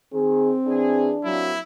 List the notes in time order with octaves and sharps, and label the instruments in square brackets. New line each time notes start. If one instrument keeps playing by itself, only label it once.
[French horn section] D#3 [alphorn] C4 [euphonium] G#4
[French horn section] E3 G#4 [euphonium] D4
[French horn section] C3 A#3 [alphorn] F#3 [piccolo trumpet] E4